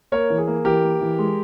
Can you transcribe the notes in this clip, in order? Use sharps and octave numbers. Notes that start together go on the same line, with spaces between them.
A#3 A#4 C#5
E3
G#4
A#3
E3 G4 A#4
A#3
E3
G#3